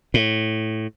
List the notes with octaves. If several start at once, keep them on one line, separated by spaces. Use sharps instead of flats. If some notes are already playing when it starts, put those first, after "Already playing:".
A2